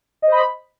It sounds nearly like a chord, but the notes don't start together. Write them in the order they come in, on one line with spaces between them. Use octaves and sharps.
D#5 C5 B5